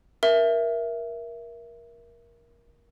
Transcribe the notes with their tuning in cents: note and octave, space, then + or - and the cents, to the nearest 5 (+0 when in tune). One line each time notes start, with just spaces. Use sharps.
A#4 +20 E5 +10